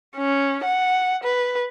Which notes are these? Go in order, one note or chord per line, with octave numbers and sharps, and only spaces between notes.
C#4
F#5
B4